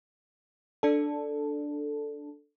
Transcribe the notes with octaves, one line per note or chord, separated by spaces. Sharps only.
D4 A4